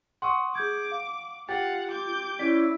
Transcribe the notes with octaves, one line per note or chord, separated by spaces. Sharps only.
F#5 C6 C#6 D#6
G#4 D6 G6 G#6
F5
F4 G4 F5 F#5 A6
D6 G6
C#4 E4 D5 B6 D7